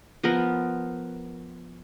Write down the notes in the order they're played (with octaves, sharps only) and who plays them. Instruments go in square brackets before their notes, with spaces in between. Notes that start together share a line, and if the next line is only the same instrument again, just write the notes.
[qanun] F3 B3 A#4